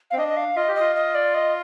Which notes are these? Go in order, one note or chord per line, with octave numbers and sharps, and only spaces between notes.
C4 F5
D4 D#5
D#5
F5
F4 D#5
G4
F4 D#5
D#5
D5
D#5